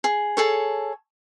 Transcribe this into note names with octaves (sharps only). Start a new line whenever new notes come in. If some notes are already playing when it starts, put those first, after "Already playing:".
G#4
G#4 A4 C#5